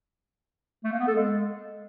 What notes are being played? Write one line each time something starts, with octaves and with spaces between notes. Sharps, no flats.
A3
A#3
B3
A4
G#3